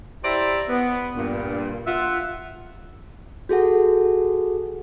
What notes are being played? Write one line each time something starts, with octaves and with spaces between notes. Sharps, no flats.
E4 G4 C5 D5 E5 A#5
B3
G2 A#2
F4 E5 F#5
F#4 G#4 A4 F#5